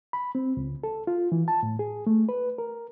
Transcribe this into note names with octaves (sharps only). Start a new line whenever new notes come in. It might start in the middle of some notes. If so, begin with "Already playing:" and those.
B5
C4
C#2
A4
F4
E3
A5
A2
G#4
A3
B4
A#4